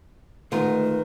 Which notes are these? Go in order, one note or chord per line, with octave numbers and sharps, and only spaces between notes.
D2 D#3 G#3 A3 F4 B4